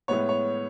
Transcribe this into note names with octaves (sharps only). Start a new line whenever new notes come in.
A2 G#3 B3 C#5
C#5